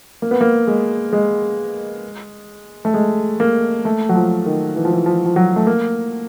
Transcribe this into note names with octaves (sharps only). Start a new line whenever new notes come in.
A#3
B3
A#3
G#3
G#3
A3
G#3
A#3
A3
F#3
F3
D#3
E3
F3
E3
F3
F3
F#3
A3
A#3